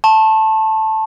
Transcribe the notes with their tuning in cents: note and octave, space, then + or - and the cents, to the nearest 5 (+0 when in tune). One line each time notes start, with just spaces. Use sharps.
A5 +0 C#6 -45